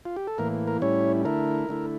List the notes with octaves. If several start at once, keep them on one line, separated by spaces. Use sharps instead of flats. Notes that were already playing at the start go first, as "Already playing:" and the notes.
F4
G4
A4
A2 E3 A#3 A#4
A#4
A2 G3 C#4 E4 C#5
D3 A3 E4 A#4
D3 A3 E4